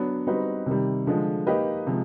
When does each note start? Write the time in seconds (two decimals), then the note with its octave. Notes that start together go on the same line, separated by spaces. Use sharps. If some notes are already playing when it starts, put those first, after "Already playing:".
Already playing: F#3 B3 D4
0.27 G3 C4 D#4 F#4 B4
0.66 C3 D#3 G3
1.07 D3 F3 G#3
1.47 A#3 D#4 G4 B4 D#5
1.87 C3 F3 G#3